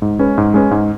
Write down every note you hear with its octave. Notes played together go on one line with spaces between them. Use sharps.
G#2
G#3 C#4 B4
G#2
G#3 C#4 B4
G#2